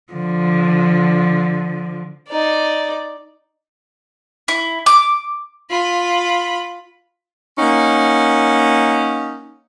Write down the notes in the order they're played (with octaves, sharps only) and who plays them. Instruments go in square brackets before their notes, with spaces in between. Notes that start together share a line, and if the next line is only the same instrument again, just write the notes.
[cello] D3 F3
[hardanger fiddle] D#4 D5
[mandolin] E4
D6
[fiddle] F4 B5
[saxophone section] A#3 C#4 D#4 F#5